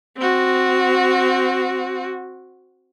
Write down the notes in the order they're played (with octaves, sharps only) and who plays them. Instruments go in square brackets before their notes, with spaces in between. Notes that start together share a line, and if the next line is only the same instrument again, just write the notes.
[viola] C4 F#4